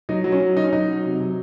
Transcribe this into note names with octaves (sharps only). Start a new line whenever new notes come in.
F#3 D#4
F#3
C#4
F#3
F#3 D#4
C#4
F#3 D#4
F#3
C3
F#3